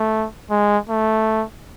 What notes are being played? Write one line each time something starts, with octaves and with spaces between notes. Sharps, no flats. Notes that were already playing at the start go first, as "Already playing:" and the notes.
Already playing: A3
G#3
A3